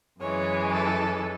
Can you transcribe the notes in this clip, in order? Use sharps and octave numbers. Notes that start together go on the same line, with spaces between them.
F#2 E3 G#3 C#5
A4